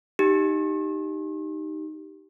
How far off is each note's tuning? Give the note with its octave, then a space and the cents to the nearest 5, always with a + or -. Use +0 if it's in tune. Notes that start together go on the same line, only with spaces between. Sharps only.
D#4 +0 G4 -5